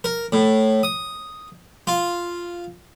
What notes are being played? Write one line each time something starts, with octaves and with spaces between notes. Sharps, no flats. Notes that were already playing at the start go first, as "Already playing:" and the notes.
A#4
A2
D#6
F4